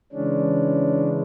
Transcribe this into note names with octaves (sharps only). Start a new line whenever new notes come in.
C#3 E3 G#3 C#4 D4